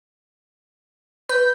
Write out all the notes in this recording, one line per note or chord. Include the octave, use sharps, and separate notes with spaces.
B4 G6